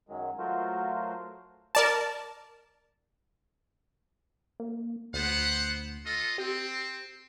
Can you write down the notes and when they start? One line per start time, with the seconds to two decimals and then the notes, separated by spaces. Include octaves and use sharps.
0.09 F#2 D#3 F#3 G#3
0.39 F#3 A3 F4 F#4 A#4 C5
1.75 A#4 D5 A5
4.60 A#3
5.13 D2 B3 C5 F#5
6.05 F4 A4 D#5
6.38 C4 G4